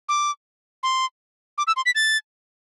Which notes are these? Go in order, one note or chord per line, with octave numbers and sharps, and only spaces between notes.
D6
C6
D6
E6
C6
B6
A6